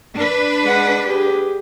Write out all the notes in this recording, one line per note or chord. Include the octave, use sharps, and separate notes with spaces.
D4 B4
G#3 F#5
G4 G#4